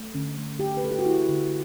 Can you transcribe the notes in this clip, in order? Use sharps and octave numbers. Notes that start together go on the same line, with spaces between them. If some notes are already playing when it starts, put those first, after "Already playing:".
Already playing: A3
D3 C#4
A3
A3 G4
B4
A3 A4
G4
F#4
A3 E4
D3